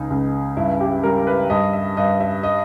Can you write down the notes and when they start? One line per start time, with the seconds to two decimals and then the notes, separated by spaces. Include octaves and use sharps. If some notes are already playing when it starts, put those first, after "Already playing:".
Already playing: C#2 D#4
0.10 C#2
0.57 G2 E4
0.80 G4
1.04 G3 A#4
1.27 B4
1.50 G2 D#5
1.73 E5
1.97 G2 D#5
2.20 E5
2.43 D#5